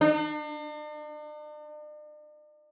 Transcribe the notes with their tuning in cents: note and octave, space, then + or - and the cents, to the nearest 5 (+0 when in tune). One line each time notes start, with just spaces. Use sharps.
D4 +45